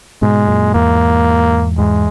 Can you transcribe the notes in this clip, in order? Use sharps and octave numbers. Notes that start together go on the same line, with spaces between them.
G#2 B2 G#3
F#2 A#2
E2 G#2 A#3
E2 G#2 G#3